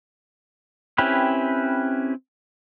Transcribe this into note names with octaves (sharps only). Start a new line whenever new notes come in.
C4 C#4 E4 G4 B4